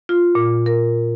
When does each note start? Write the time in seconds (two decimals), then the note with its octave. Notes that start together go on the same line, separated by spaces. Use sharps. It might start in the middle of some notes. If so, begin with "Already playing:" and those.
0.09 F4
0.35 A#2
0.66 A#4